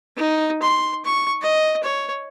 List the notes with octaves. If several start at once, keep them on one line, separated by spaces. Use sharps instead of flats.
D#4
C6
C#6
D#5
C#5